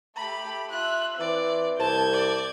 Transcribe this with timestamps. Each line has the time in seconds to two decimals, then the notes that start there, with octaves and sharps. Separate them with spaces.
0.16 A3 G4 B5
0.70 F4 E5 F#6
1.20 E3 C4 D5
1.79 C2 A5 G6 G#6
2.13 D5